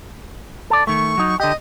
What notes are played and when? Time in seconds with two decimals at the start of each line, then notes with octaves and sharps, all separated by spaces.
0.70 A4 D5
0.87 D#3 A3 C#6
1.18 F#3 D#4
1.40 D3 G4 D#5